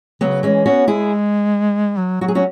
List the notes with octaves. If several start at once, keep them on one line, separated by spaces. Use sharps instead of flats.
C#3 F#3 B3
E3 G#3 C#4
B3 C#4 F#4
G#3 E4 G#4
F#3
F#3 F#4
G#4
C#4 F#4